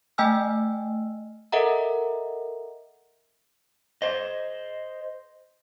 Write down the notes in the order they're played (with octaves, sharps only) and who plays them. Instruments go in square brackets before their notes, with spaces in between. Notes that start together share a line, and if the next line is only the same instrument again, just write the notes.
[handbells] A3 D#5 G5 G#5 E6 F6
A4 A#4 D#5 E5 F#5 A#5
[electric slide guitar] C5 D#5